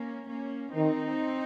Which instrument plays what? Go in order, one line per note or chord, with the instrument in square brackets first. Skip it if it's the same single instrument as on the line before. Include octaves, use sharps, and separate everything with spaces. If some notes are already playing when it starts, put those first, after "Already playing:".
Already playing: [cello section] A#3 C#4
A#3 C#4
[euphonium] D#3 [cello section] C4 D#4